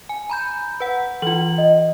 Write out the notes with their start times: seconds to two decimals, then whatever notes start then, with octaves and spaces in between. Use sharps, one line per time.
0.09 G#5
0.30 A#5 B5 G6
0.80 B4 F#5
1.22 E3 F4 F#7
1.58 D#5